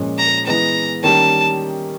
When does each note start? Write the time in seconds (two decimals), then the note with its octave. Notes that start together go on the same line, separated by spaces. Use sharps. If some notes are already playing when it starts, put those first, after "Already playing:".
Already playing: A#2 F3 G#3 C#4
0.18 A#5
0.46 E3 G#3 B3 A#5
1.03 D#3 G3 A#3 C#4 A5